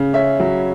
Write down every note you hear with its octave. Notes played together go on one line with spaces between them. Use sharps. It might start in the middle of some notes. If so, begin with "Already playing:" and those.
Already playing: C#3
C#4 E5
F#3